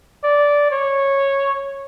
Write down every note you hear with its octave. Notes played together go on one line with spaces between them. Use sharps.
D5
C#5